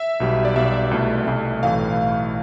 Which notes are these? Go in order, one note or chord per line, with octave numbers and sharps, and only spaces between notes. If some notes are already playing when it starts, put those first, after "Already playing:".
Already playing: E5
B1 B2 G3
D5
B1 B2 G3 E5
E5
C2 B2 A3
C2 B2 A3
B1 A2 E3 A3 F5